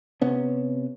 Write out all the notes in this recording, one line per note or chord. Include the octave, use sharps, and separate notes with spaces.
C3 B3 C#4